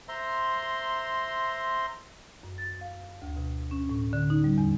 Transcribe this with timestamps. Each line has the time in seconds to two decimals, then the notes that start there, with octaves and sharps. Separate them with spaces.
0.08 C5 E5 A#5 C6
2.43 F#2
2.58 A6
2.81 F5
3.22 D2
3.37 B2
3.71 C#4
3.89 A2
4.13 D3
4.30 D#4
4.44 G3
4.58 E2